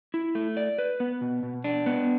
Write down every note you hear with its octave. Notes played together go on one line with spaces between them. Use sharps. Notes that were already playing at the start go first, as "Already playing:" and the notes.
E4
A3
D5
B4
B3
B2
B2
D4
B3